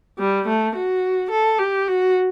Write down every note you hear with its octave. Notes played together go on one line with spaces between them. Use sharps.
G3
A3
F#4
A4
G4
F#4